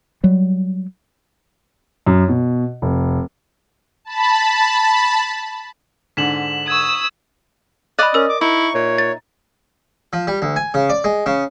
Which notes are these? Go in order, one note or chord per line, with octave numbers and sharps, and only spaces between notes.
F#3 G3
F#2
B2
F1
A5 B5
G#2 D3 B6 E7 F#7
C#6 D#6 E6 G#6
D5 D#5 B5 D#6 F#6
C#4 A#4 E6
D6
D#4 E4 E5 C#6
A#2 C#5
A6
F3
G3
D2
G#5
C#3
D5
G#3
C#3